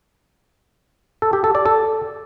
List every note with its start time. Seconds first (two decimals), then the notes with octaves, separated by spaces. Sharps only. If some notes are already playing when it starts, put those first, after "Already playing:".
1.22 A4
1.33 G4
1.44 A4
1.55 D5
1.66 A4